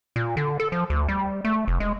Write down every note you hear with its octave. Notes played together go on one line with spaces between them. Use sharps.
A#2
D3
A4
F3
D2
G3
A3
F1
G#3